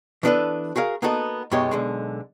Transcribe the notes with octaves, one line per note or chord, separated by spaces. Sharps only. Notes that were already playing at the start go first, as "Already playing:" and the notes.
E3 B3 D4 G4 A4 B4
F#4 G#4 A#4 F5
A#3 B3 D#4 F#4 A4
F#2 B2 G#3 D#4 G4 C#5
B1 D3 G#3